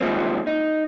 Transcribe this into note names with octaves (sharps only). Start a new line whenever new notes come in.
D#3 F3 G3 G#3 A#3 C4
D#4